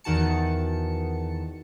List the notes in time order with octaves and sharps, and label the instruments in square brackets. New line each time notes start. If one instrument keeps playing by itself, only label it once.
[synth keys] E2 D#3 F#4 A5 C#7